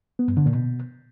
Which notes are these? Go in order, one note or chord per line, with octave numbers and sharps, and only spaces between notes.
B3
G2
D3
A#2
B2